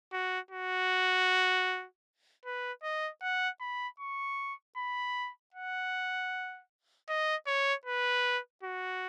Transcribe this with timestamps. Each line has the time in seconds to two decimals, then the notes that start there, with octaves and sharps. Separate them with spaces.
0.13 F#4
0.51 F#4
2.45 B4
2.83 D#5
3.22 F#5
3.61 B5
4.00 C#6
4.77 B5
5.54 F#5
7.09 D#5
7.47 C#5
7.86 B4
8.63 F#4